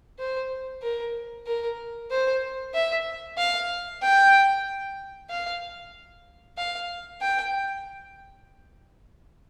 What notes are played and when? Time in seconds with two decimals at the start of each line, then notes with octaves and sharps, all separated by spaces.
0.19 C5
0.83 A#4
1.47 A#4
2.11 C5
2.74 E5
3.38 F5
4.03 G5
5.30 F5
6.58 F5
7.22 G5